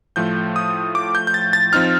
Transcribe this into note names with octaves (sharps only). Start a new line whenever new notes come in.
A2 F3 A3 G6
D#6
D6
G6
G6
A6
A6
F3 C4 D#4 F6